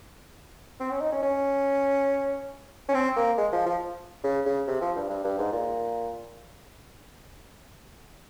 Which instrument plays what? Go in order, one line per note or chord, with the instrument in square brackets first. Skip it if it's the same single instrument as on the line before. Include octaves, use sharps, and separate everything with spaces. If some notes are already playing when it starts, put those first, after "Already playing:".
[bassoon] C4
C#4
D#4
C#4
C#4
C#4
C4
A#3
G#3
F3
F3
C#3
C#3
C3
F3
G2
G2
G2
G#2
A#2